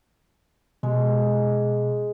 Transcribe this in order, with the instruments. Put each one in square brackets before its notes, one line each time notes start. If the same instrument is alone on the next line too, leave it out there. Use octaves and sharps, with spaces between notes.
[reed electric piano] B2 [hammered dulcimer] G#3